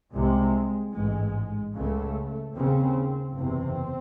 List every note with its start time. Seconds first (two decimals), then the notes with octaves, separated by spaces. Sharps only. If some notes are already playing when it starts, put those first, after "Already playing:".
0.14 C2 C3 G#3
0.94 A1 G#2 G#3
1.74 C#2 C#3 A3
2.55 D#2 C#3 C4
3.35 F#1 E2 C3 C4